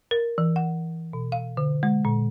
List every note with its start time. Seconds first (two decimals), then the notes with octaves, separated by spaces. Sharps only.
0.11 A#4
0.38 E3
0.56 F#5
1.13 B2
1.32 F5
1.57 D3
1.83 G#3
2.05 A#2